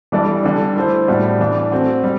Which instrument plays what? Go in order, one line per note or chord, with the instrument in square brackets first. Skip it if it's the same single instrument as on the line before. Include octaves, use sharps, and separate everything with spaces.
[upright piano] E3 G3 D4 A4 D5
D3 G3 D4
A3 E4 A4 C5
A2 G3 D4 F#4
E3 A3 D4
A3 C4 F#4
G3